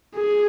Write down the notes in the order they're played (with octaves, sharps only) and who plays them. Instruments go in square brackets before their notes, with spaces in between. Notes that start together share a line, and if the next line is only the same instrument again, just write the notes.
[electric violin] G#4